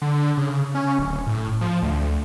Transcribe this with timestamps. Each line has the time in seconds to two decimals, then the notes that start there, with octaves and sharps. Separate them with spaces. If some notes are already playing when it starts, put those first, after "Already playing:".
0.02 D3
0.37 C#3
0.75 C#4
0.99 D1
1.27 A2
1.61 F3
1.82 D2